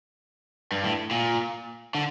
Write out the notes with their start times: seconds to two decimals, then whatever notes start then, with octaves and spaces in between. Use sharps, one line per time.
0.72 G2
0.84 A2
1.11 A#2
1.95 D3